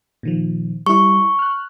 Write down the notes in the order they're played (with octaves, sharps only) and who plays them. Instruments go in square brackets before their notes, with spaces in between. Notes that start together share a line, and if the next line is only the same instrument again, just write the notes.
[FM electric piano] A#2 D#3 F3
[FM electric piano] G3 E4 [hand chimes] C#6
[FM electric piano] F6 F#6